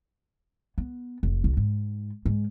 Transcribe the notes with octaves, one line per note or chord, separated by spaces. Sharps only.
B3
F1
C2
G#2
G#2